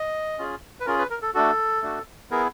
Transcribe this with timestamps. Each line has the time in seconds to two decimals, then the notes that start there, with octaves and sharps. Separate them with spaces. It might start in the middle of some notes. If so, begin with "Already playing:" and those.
Already playing: D#5
0.39 C#4 F4 G#4
0.80 B4
0.86 C#4 F4 G#4 A#4
0.99 B4
1.10 A#4
1.22 A4
1.34 A3 D4 F#4 A4
1.82 A3 D4 F#4
2.31 B3 E4 G#4 A#4